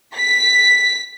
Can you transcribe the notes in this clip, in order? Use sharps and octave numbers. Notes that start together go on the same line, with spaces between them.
B6